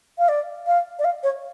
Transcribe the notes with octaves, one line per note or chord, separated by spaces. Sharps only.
F5
D5
F5
D5
F5
C#5